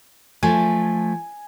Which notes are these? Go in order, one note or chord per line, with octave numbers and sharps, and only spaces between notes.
F3 A3 G#5